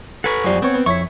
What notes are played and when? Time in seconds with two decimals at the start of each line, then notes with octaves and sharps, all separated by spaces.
0.24 A4 B4 F#5 G#5 C#6
0.44 F#2 F3 G3 C5
0.62 B3 C4 C#5
0.74 B3
0.86 F2 E4 C#5 E5 C#6